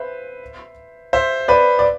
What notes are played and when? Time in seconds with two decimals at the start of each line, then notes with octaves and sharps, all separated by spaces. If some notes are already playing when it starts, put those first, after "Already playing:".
Already playing: B4 C5 E5
1.13 C5 E5
1.48 B4 D5
1.79 D5